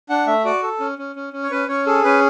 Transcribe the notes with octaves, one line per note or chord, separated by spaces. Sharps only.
D4 F#5
A3 E5
F#4 D5
A4
C#4
C#4
C#4
C#4
C#5
C#4 B4
C#4 C#5
G#4 A4
C#4 B4